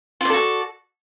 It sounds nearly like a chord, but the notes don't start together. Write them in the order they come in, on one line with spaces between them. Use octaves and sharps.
F4 D5 A4 F#4